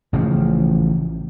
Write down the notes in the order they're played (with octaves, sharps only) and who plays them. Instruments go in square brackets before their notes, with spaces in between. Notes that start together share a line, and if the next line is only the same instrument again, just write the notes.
[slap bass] A1 C#3 F3